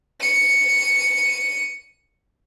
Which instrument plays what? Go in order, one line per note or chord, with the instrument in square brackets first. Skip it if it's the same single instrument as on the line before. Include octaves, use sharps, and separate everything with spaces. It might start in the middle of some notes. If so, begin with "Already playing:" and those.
[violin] C#7 D#7